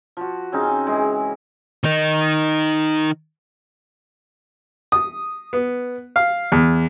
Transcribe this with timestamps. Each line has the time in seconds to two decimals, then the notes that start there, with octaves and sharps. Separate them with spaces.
0.17 F3 F#4
0.52 C#3 C4 C#4 D#4
0.87 E3 G#3
1.84 D#3 D#4
4.92 D#6
5.53 B3
6.16 F5
6.52 E2